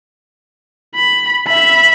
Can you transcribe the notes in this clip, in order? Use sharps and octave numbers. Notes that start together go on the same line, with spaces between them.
B5
E5 B5